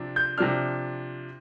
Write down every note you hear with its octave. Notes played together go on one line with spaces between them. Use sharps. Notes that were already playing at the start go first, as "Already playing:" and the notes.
Already playing: C3 F3 D4
G6
C3 F3 D4 F6